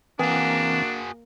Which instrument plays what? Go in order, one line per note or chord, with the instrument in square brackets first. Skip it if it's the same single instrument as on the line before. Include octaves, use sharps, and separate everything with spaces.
[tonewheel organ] E3 C4 [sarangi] A#3 [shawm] D4 [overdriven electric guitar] F#4 G#4